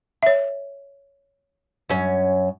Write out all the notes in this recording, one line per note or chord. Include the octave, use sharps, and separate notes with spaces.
C#5 E5
F#2 C#4